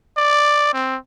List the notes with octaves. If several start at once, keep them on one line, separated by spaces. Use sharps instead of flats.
D5
C4